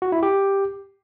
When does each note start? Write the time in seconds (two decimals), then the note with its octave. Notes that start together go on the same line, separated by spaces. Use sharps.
0.02 F#4
0.12 E4
0.23 G4